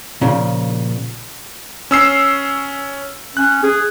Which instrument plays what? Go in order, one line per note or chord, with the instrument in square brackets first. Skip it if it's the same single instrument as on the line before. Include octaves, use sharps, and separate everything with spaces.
[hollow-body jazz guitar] A#2 C#3 F3
[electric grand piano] C#4 E6 C7
[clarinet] C#4 [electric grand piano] F#6
[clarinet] G#4